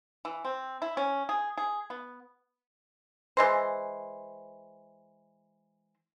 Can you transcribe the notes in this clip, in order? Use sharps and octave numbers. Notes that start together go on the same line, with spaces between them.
E3
C4
E4
C#4
G#4
G#4
B3
E3 G#3 C5